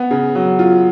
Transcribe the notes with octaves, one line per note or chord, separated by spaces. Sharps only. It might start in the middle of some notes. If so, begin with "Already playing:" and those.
Already playing: B3
C#3
F#3
F4